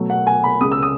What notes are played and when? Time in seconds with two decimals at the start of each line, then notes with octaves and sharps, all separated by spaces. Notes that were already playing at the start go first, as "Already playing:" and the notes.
Already playing: B2 F#3 A3
0.10 F#5
0.27 G#5
0.44 B5
0.61 C#2 C#3 G#3 D#6
0.72 E6
0.82 D#6